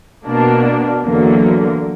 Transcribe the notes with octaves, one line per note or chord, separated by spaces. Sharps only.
B2 A#3 D4
E2 D3 F#3 A#3